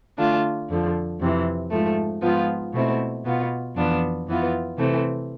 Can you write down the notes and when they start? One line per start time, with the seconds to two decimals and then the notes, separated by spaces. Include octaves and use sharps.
0.17 D3 A3 D4 F4
0.69 F2 D3 F3
1.20 F2 C3 E3
1.71 G#2 F3 A3
2.22 G#2 F3 B3 F4
2.74 B2 A3 C4 E4
3.25 B2 B3 F4
3.75 F2 E3 B3 D4 F4
4.27 F2 E3 B3 F4
4.78 C3 E3 A3 C4